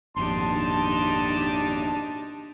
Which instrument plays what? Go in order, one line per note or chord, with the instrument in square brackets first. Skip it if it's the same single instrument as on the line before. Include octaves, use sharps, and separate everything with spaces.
[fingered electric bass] G#1 F2 A#2 [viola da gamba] D4 D#4 G4 [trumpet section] A5 [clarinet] C6